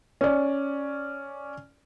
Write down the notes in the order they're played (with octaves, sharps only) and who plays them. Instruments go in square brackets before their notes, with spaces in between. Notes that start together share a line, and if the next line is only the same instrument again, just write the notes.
[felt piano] C#4 D5